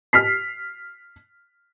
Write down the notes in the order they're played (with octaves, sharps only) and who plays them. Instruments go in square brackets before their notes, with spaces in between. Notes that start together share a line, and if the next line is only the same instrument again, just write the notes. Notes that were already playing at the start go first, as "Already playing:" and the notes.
[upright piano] F6 B6 C7